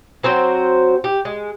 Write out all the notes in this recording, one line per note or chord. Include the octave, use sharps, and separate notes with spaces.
F#3 C4 F#4 C5
G4
G#3